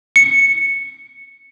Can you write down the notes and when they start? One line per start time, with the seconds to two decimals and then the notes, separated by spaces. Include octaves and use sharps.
0.16 C#7